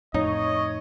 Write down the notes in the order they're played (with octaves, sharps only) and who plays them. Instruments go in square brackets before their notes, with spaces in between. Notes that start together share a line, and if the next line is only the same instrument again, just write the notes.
[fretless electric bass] F2 A2 [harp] D#4 [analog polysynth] C#5 [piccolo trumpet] D#5